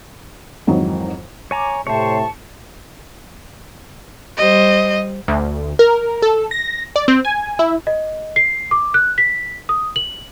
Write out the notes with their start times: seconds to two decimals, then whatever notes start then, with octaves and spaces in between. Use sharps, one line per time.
0.67 F2 G#2 D#3 E3 F#3 D#4
1.51 C#5 G#5 A#5 D6
1.87 A2 C3 C5 C#5 A5 C#6
4.37 G3 C5 D#5
5.28 D2
5.79 A#4
6.22 A4
6.51 A#6
6.96 D5
7.08 C4
7.25 G#5
7.59 E4
7.87 D#5
8.36 C7
8.71 D6
8.94 F#6
9.18 B6
9.69 D#6
9.96 F#7